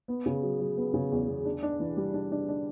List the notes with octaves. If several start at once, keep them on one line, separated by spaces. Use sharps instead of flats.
B3
C#3
F#3
F#3
B3
C#3
E2
E2
D4
D4
E3
G3
D4
D4
D4